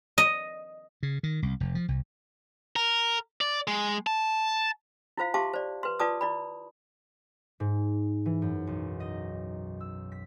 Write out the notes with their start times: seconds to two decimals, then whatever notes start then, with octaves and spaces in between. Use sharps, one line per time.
0.18 D#5
1.03 C#3
1.23 D#3
1.42 C2
1.60 F1
1.75 F3
1.88 C2
2.76 A#4
3.41 D5
3.67 G#3
4.07 A5
5.17 E4 F4 C5 F5
5.34 G4 E5 F5 A5 C6 D6
5.53 C5 D5
5.83 B4 C6
5.99 F4 B4 D5 A5 D6 D#6
6.21 E4 D5 B5
7.60 G#2
8.26 E3
8.42 F#2
8.67 B1
9.00 D#5
9.81 E6
10.12 B6